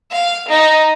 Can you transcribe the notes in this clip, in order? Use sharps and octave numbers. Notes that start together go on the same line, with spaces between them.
F5
D#4